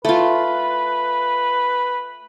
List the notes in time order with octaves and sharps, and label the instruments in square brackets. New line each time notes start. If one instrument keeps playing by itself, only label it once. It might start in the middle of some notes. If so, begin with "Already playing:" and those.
[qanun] A3 F4 [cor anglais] B4